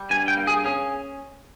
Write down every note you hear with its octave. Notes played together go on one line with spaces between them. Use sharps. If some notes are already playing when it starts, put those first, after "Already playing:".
Already playing: G3
G2 G#5
G5
A#3
G#4
C#4 G#4